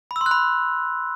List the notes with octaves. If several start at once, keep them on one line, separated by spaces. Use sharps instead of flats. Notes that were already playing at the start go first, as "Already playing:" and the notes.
B5
E6
C6
F#6
B5